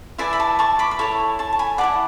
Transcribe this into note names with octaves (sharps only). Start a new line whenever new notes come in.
E4 B4 D5 E5 G#5
B5
A5 C#6
A5 C#6
B5 D6
B5
E4 A4 C#5 A5 C#6
A5 C#6
A5
G#5 B5
B4 D5 F#5 A5
E4